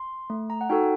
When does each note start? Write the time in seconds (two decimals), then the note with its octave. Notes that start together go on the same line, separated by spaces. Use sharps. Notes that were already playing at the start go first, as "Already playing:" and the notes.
Already playing: C6
0.30 A3
0.50 A#5
0.61 F#5
0.69 D#4 F#4 A4 G5